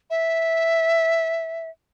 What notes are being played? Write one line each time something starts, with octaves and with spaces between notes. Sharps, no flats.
E5